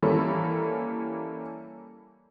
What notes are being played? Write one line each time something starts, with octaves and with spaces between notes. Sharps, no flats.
E3 G3 A#3 C#4 A4 B5